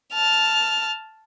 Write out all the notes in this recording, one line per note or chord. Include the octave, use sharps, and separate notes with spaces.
A5 F6